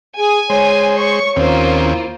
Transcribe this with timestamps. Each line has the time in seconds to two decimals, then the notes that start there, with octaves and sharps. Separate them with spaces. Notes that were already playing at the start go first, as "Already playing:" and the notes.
0.18 G#4 G#5
0.50 G#3 C5 C#5
1.00 C#5 C#6
1.36 D#2 A#3 C4 C#4 F4 C5
1.82 E4